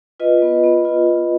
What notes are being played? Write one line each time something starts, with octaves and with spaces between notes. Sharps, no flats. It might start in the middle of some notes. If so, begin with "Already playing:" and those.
F4 B4 D#5
B3
B3
F4
F4